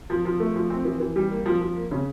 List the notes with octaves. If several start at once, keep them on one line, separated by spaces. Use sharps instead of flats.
F3
F3
A3
F3
C4
E3
E3
G3
A#3
F3
F3
A#3
C#3